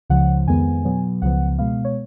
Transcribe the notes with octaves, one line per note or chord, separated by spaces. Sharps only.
C#2 C#3 F3 F#5
F2 D#3 G#3 B3 G#5
B2 F#3 B3
C#2 C#3 F3 B3 F#5
B2 G#3 B3 F5
C#5